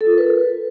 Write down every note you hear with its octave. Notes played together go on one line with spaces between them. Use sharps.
A4
F4
A#4
B4